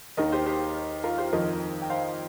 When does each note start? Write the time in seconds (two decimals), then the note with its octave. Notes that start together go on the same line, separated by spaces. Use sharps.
0.17 D#2 D#3 A#4 D#5
0.32 G4 C5
0.46 G4 C5
1.04 F4 A#4
1.18 G4 C5
1.33 F2 D#3 A#4 D#5
1.82 G5
1.90 C5 F5